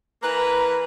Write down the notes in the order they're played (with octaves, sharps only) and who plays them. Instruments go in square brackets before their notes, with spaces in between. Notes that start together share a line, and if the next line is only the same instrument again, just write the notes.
[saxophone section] E3 A#3 B4 [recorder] A#5